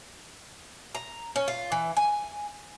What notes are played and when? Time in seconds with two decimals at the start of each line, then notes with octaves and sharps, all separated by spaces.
0.95 A#5
1.36 C#4
1.48 F4
1.72 E3
1.97 G#5